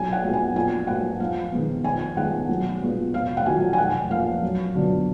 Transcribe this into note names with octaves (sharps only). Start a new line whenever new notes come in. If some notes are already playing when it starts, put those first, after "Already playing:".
Already playing: B1 G#5
F#5
A#2 G#3 B3
G#5
A#1 G#5
G#2 F#3 A#3 F#5
F2 F5
D#3 G#3 B3
F2 G#5
D#3 G#3 B3 F#5
B1
A#2 G#3 B3
F1 F5
F#5
F2 D#3 F#3 G#5
G#5
F1 F#5
F2 F3 A#3 F5
F#2
D3 F#3 B3